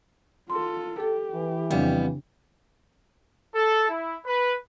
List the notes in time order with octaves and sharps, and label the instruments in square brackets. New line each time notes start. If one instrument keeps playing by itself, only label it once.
[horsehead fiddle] F4 A4 [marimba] C6
[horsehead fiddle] G4 [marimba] A4
[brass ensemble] E3
[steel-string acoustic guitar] F2 G3 B3 [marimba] C#3 D4
[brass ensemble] A4
E4
B4